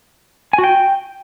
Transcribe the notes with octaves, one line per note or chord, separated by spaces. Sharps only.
G#5
F#4
G5